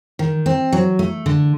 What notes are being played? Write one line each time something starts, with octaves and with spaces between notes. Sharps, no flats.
D#3
C4
F#3
A3
D3